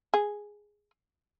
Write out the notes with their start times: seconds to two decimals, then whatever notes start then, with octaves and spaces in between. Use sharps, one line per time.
0.14 G#4